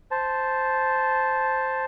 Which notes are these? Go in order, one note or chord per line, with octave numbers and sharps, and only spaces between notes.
C5 A5